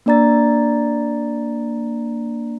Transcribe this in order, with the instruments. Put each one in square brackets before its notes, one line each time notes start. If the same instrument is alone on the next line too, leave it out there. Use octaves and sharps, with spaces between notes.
[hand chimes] A#3 D4 D5 A#5 A6